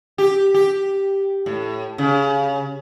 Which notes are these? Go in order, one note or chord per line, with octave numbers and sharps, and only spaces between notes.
G4
G4
A2
C#3